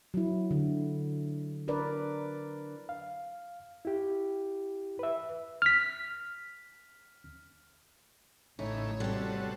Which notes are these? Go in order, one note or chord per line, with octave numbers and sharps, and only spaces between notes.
F#3 E4
D3
D4 A#4 B4 D5
F5
E4 G4
B4 E5
F6 B6
A1 A2 C#3 E3 D#4 C#5
C3 G3 B3 F#4 A4